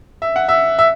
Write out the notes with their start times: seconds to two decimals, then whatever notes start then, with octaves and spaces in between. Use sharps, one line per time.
0.22 E5
0.36 F#5
0.49 E5
0.79 E5